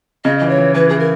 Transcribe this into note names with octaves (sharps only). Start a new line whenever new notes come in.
C#3 D#5
E3 D#5
C#5
E3
E3 B4
E3 G#4
A#4